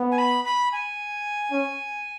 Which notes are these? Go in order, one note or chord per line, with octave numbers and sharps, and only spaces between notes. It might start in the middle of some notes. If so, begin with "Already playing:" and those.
Already playing: B3
G#5
B5
B5
G#5
C#4